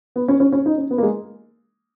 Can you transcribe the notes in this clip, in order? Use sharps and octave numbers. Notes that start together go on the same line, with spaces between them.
B3
C#4
C#4
C#4
D#4
C#4
B3
A#3
G#3